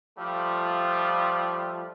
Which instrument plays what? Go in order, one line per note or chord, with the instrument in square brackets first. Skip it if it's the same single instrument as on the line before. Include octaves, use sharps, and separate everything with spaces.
[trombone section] F3 G3 A3 F4